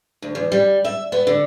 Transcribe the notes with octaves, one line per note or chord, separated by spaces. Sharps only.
D2
E2
G3
E5
B3
D3